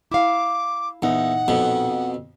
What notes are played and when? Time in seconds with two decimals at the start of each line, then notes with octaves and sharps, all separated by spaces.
0.12 E4 F5 D6
1.02 E2 A#2 D#4 F#5
1.48 F2 B2